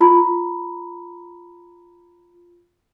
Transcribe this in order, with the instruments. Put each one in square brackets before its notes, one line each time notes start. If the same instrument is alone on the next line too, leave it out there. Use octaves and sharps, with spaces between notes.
[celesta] F4 A#5 B5